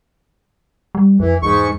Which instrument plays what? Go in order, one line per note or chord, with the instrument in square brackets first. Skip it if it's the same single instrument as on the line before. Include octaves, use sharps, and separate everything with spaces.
[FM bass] G3
[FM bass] F2 [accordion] E3
[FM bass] E2 [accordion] G#2 C#6